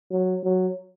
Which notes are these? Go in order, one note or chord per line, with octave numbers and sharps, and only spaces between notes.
F#3
F#3